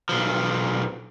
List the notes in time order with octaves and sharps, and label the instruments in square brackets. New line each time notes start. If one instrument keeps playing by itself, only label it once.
[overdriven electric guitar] B1 F3